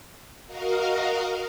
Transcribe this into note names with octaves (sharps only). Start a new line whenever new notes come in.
F#4 A#4 D#5 F5